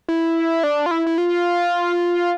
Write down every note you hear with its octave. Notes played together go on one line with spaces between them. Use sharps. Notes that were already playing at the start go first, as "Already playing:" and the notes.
E4
D4
F4
E4
E4
F4